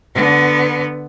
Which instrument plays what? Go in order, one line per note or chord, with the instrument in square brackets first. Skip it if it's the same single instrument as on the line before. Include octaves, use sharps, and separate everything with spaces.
[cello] D3 B3